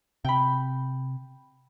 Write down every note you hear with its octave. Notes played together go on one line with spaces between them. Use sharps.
C3 G5 B5